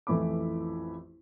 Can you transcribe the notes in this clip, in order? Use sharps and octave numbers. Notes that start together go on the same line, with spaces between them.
A1 F2 E3 A3 B5 D6